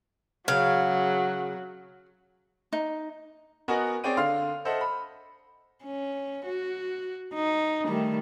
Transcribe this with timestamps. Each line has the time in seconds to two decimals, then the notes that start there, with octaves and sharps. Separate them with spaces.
0.48 C#3 F#3 F5
2.73 D#4
3.68 B3 F#4 A#4 D#5 F#5 G#5
4.04 C4 G#4 C#5 D5 G5 D#7
4.17 D3 F5 C6 F6
4.65 A4 C5 D#5 E5 F#5
4.81 B5
5.84 C#4
6.46 F#4
7.34 D#4
7.85 D#3 G3 A3